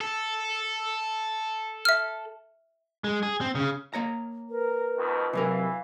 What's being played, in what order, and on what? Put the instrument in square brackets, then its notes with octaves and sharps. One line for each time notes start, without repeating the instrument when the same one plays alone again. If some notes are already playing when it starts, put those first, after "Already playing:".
[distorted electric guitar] A4
[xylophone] E5 F6
[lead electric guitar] G#3
G#4
C4
C#3
[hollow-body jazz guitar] A#3 C#5 A#5
[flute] A#4 [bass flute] B4
[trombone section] F2 B2 D#3
[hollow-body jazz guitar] C3 F#3 A#4 [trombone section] E3 [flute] F5